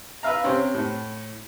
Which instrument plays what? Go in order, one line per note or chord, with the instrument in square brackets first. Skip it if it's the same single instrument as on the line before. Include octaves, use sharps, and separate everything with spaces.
[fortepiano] B4 E5 F5 A#5
C3 C4 C#4
A2